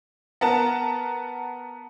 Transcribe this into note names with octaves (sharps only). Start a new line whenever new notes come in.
B3 A#4 F#5 A5